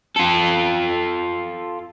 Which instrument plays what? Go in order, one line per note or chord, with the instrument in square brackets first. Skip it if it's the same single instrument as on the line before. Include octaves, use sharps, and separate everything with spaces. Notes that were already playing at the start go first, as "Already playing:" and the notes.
[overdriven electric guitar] F4 A4